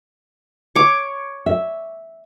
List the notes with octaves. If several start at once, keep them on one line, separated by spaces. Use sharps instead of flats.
C#5 D6
E5